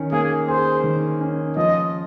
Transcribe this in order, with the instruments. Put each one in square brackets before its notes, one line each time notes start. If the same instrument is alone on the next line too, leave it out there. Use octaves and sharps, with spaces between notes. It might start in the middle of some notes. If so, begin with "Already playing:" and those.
Already playing: [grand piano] D#3 C#4
[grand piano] A#3 [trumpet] G#4
[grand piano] G#4 [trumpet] C5
[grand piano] D#3
C#4
[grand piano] F3 [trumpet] D#5